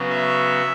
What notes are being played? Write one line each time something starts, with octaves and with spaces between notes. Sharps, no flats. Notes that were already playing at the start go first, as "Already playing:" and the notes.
Already playing: C#3 F#3 B3
E5